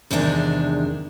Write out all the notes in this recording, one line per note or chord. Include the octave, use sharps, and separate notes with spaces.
E2 C3 D#3 G#3 D4